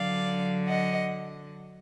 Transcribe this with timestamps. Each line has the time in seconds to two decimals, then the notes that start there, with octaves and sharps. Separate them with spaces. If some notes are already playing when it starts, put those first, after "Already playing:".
Already playing: D3 F#3 D5 F5
0.67 D#5 F#5